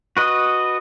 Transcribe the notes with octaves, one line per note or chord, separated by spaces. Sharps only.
F#4 B4 D#5